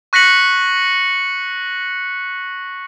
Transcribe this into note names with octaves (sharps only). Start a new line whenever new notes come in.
C#6 F#6 A#6 B6 C#7 F#7